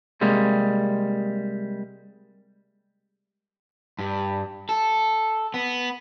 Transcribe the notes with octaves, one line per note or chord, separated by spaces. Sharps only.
C3 G3 G#3 A#3
G2
A4
B3